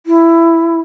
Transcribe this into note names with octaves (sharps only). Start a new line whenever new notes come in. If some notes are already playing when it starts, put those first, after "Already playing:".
E4